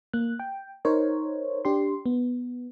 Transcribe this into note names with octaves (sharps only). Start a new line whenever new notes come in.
A#3 F#6
G5
D#4 A#4 C5 C#5
D4 G4 C6
B3